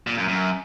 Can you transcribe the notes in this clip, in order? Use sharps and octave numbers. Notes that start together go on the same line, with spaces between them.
A#2
F#2
F#2